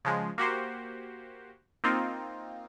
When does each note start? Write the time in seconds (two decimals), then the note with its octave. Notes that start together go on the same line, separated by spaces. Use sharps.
0.05 C#3 F3 G#3
0.38 A#3 F#4 G4 C5
1.84 A#3 C4 D#4 F4